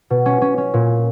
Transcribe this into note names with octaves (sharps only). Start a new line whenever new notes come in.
B2
C#4
C#4
C#4
A#2